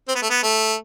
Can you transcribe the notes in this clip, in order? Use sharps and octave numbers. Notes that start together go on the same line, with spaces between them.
C4
B3
A3
B3
A3